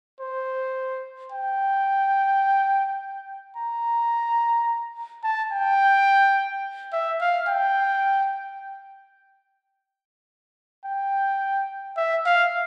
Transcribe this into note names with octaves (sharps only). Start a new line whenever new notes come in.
C5
G5
A#5
A5
G5
E5
F5
G5
G5
E5
F5